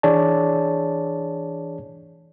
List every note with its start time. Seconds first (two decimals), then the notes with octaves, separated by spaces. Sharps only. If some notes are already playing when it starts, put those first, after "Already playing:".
0.03 E3 D4 G#4 C#5 D5 A5